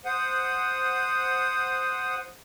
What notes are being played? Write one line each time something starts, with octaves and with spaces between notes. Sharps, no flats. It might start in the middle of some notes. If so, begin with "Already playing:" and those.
C5 F#5 D#6